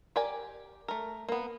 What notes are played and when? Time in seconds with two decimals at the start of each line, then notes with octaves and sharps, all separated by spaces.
0.16 G4 A#4 D5 G5 G#5
0.88 A3 A#4
1.29 A#3 B3